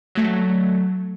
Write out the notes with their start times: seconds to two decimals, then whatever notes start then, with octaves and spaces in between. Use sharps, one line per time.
0.15 F#3 A3